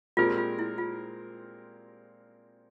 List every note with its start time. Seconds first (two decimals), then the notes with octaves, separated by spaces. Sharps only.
0.17 A#2 G#3 C4 F4 G4 A#4
0.38 F4
0.59 E4
0.78 F4